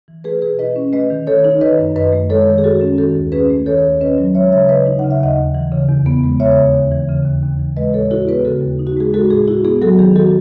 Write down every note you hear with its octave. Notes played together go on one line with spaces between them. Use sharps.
E3
A3 G#4 B4
B2 G#4 B4
E4 B4 D#5
C#4
A3 B4 D#5
D#3
D#3 A4 C#5
D#4
D#3 B4 D#5
F#2
F#2 B4 D#5
A3
G#3 A4 C#5
D#3
G#4
D#3 F#4 A4
C#4
D#3 F#4 A4
D#2
C#4 G#4 B4
A3
D#3 A4 C#5
D#2
C#4 B4 D#5
F#3
G#3 C#5 E5
C#3 C#5 E5
C#3 B4 D#5
D#4
F#5
C#3
E5
D#2 D#5 F#5
D#2
E3
C#3
E2
B3
G#3
C#3 C#5 E5
D#2
D#2
E3
C#3
D#2
D#2
E3
G#3 B4 D#5
A2 A4 C#5
E4 F#4 A4
B3 G#4 B4
C#3 F#4 A4
D#2
D#4
F#4
G#3 G#4
G#3 F#4 A4
A2 G#4
E4 F#4
B3 G#4
F#3 F#4 A4
D#3 G#4
D#3 F#4 A4